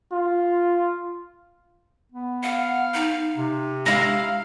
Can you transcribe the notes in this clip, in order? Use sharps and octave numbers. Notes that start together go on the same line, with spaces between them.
F4
B3
F5 F#5
D#4
C3
G#3 E4 F5 A#5